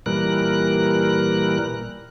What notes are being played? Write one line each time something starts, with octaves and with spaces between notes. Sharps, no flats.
A#2 E3 G3 A#4 F#6